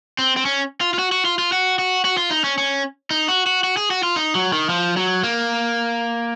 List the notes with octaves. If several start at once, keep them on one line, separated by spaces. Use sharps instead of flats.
C4
C4
C#4
F4
F4
F#4
F#4
F4
F4
F#4
F#4
F#4
F4
D#4
C#4
C#4
D#4
F#4
F#4
F#4
G#4
F#4
F4
D#4
F#3
D#3
F3
F#3
A#3